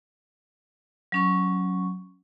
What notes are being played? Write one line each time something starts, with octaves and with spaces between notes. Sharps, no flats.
F#3 C#4 C#6